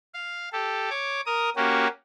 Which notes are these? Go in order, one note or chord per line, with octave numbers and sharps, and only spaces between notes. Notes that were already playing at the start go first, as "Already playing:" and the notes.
F5
G4 A4
C#5 D6
A#4 D#6
A#3 C#4 F#4 G4